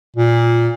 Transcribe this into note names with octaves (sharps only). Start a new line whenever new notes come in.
A#2